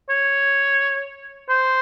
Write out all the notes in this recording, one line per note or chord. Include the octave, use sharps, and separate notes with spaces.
C#5
C5